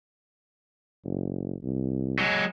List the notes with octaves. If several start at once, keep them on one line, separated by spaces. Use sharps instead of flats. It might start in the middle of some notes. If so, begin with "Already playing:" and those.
F#1
C2
F#3 G#3